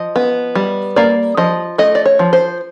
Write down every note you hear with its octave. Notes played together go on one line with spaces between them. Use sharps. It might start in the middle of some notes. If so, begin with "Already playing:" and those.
Already playing: F3 D#5
B3
G3
A#3 D5
F3 D#5
A3 D#5
D5
C#5
F3
C5